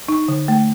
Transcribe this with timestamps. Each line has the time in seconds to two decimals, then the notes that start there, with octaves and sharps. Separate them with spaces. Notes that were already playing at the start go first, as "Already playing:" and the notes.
0.09 D#4
0.28 D3
0.48 A3